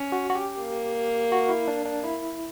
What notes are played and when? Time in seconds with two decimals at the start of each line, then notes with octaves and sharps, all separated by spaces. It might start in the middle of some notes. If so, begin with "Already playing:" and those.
Already playing: C#4
0.12 F#4
0.30 F#4
0.35 G4
0.59 A#3
1.32 F#4
1.49 E4
1.68 D4
1.85 D4
2.04 E4